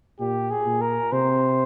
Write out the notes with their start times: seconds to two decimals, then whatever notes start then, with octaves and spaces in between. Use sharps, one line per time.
0.20 A#2 G4
0.51 G#4
0.66 A#2
0.81 A#4
1.12 C3 C5